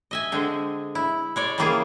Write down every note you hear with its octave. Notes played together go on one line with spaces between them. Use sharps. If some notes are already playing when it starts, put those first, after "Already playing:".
D#5 E5 G#5
D3 G#3 C4
E4
G#3 C#5 D5
C#3 E3 G3 A#3 F4 G#4